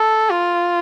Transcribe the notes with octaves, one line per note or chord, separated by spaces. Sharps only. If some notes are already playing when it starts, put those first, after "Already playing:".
Already playing: A4
F4